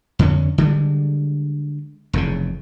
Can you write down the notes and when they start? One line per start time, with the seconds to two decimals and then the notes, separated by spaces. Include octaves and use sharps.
0.19 F2 D3 C4 C#4
0.58 D3 G3 G#3
2.13 F1 E2 A#2 C#3